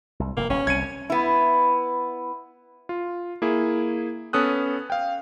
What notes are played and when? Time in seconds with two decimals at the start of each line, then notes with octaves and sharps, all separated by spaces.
0.20 C2
0.37 F1 G2 A#3
0.50 E1 E2 C#4
0.67 C2 G#6 C#7 D#7
1.10 B3 E4
2.89 F4
3.42 A#3 E4 G#4
4.33 B3 C#4 A4 D#6 F#6
4.90 F5 G5